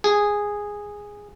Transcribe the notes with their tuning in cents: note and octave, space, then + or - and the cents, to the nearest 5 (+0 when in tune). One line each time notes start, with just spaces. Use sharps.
G#4 -10